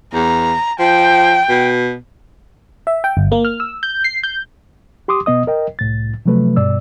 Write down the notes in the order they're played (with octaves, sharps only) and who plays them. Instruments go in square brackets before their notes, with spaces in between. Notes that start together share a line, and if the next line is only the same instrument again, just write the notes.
[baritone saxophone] E2 [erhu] A#5
[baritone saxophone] F3 [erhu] G5
[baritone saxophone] B2
[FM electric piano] E5
G5
G1
A#3
F6
E6
G6
C7
G6
[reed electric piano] G4 C6 D6 D#6
B2 B3 D#5 D#6
A#4 D#5 G5
C2 A2 A6
C3 F3 F#3 A3 B4
G2 B2 D5 E6